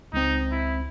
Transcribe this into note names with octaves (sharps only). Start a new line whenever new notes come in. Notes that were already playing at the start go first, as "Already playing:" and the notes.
C#2 C4 D#4
E4